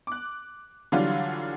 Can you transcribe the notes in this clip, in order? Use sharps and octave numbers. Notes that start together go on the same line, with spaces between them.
D6 F#6
D3 E3 F#3 G3 F4